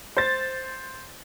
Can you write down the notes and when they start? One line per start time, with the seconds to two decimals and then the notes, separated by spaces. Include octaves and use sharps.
0.17 C5 A6